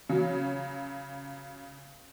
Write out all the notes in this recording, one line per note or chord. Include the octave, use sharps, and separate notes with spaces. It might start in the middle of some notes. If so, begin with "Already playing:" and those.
C#3 F#3